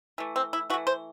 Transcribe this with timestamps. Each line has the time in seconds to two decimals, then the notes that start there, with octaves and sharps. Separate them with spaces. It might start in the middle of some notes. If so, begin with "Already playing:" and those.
0.18 E3 A3
0.36 C4
0.53 E4
0.70 E3 F#4
0.74 A3
0.87 C5